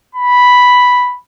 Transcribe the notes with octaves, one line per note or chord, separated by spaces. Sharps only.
B5